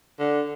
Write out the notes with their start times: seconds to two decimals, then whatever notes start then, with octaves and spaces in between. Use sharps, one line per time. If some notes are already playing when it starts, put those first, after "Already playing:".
0.19 D3